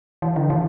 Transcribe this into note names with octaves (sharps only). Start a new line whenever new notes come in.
E3
D3
E3